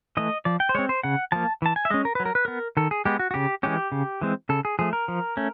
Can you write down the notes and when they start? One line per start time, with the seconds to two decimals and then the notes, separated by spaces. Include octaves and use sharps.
0.17 E3 A3 D#5
0.45 F3 D5
0.60 G5
0.69 C5
0.75 G#3 C4 C#5
0.89 C5
1.03 C#3 F#5
1.32 F3 A#3 A5
1.62 E3 A5
1.76 G#5
1.85 E5
1.90 G#3 C#4 D#5
2.05 A#4
2.15 F#3 B4
2.25 A#4
2.35 B4
2.45 B3 A#4
2.77 D#3 A4
2.91 G#4
3.05 G#3 B3 G4
3.19 F#4
3.31 F#4
3.34 C#3 G4
3.63 E3 G#3 C#4 G4
3.92 C#3
4.22 E3 G#3 C4
4.49 C#3 A4
4.65 G#4
4.79 F3 A3 G#4
4.93 A#4
5.08 F3
5.37 A3 C#4